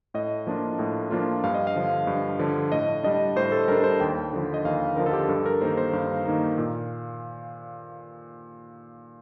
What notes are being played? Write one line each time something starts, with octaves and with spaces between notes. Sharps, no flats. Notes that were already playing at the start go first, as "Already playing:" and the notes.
A2 D#5
F3 A#3 D4 F4
A2
F3 A#3 D4 F4
G2 F5
D#5
F5
D3 F3
G2
D3 F3
A2 D#5
G3 D4 D#5
A2 C5
A4
G3 D4 A#4
C5
D#2 G5
D3 F3
D#5
D#2 F5
D3 F3 A#4
A4
G4
G2 A4
A#4
D#3 A#3 D#4 C5
C5
G2 F5
D#3 A#3 D#4
A#2